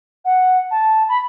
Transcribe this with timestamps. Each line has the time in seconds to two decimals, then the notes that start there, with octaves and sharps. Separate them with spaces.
0.25 F#5
0.71 A5
1.09 B5